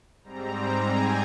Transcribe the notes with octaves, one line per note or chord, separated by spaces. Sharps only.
G#2 G3 C4 A#5
G#5